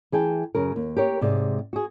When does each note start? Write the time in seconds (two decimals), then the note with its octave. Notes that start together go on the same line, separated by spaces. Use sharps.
0.12 E3 G#4 G5 A5
0.55 F#2 C#3 A#4
0.76 D#2
0.96 G4 A#4 C#5
1.21 G#2 C3 G#3 D5
1.73 F#4 G#4